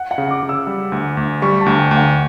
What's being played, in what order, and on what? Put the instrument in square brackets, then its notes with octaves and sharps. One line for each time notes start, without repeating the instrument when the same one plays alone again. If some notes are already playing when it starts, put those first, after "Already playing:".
Already playing: [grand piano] F#5
F#5
[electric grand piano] C#3
[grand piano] D6
[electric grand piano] C#3
[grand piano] E6
[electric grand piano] G3
D2
D2
[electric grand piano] G3 [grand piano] C#6
[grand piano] A5
[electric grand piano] D2
[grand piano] G5
[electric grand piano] D2
[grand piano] F#5